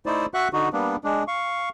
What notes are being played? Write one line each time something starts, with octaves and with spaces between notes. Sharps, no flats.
A3 D#4 E4 C5 D5
F#4 E5 F#5 C#6 F#6
D3 D#4 F#4
G3 A#3 B3 D4
G#3 D4
F5 C#6